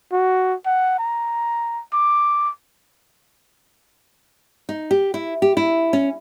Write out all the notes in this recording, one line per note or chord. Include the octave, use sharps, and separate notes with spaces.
F#4
F#5
A#5
D6
D#4
G4
E4
G4
E4
C#4